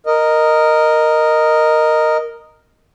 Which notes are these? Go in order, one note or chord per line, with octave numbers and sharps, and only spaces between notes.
A#4 D#5